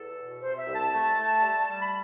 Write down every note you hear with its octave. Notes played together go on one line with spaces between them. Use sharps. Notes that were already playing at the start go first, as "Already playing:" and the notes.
Already playing: E2 A4
B2
C3 C5
E5
C2
A5
A3 A5
A3
G3
G3
B5